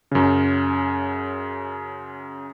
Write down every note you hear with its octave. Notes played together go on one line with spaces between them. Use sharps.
F#2 C#3